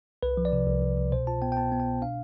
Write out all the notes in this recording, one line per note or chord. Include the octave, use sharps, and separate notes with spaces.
C2 B4
F3
D5
C3
C2
C2
C2
B2 C5
F4 A5
B3 G5
G5
B3 A5
B3
G5
B2
D4 F5